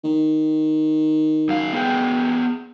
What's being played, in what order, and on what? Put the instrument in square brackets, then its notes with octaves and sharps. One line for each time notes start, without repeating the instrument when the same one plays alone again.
[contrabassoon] D#3
[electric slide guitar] F#2 F5
B3 G#4 G5